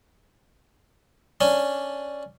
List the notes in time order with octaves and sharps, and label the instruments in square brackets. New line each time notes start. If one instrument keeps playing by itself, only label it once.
[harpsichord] C#4 D4